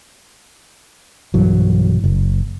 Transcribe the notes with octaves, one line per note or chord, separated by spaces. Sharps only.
B1 G2 E3 F#3
F#1